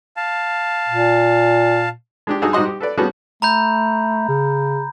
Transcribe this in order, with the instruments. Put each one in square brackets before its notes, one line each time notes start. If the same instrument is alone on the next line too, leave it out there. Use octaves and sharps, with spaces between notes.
[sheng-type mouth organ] F5 A5
[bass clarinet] A#2
[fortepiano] G#3 D4 G4
G2 D#4 F#4 G#4 D#5 E6
G#2 G3 F#4 D#5 C6
G4
A4 B4 D5
G3 A3 B3 C#4 F#4 G#4
[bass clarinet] A3 [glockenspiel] A#5 B5 G6
[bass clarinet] C#3